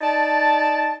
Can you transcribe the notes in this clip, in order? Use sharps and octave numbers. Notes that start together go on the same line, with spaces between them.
D#4 D5 A5